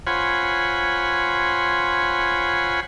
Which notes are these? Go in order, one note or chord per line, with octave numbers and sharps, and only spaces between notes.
F4 C5 C#5 F#5 G#5 B5